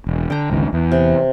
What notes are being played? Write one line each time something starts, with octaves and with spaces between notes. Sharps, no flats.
E1
D3 G5 A#5
G1 C#2 D#3
E2
C3